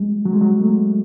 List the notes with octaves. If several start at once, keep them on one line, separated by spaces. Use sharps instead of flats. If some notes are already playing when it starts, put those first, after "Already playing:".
Already playing: F#3 G#3
F#3
G#3
F#3
A3